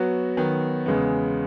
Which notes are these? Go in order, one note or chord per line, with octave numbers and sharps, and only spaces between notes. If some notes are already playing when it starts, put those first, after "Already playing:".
Already playing: F#3 B3 F#4
D#3 F#3 B3
E2 C#3 G#3 B3